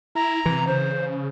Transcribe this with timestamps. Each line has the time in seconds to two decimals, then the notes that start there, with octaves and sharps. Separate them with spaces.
0.15 E4 A#5
0.46 C3 E3
0.67 C#3 C5